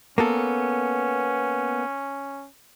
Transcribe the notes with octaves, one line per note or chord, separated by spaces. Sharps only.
A#3 B3 C#4 A4